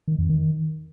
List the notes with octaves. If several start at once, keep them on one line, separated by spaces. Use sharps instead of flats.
D#3
F2
D#3